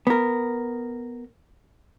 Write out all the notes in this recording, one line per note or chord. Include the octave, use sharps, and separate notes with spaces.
B3 A#4